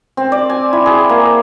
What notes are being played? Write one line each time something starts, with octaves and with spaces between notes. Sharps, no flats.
C4
D5
G#5
E4
G#4
A#3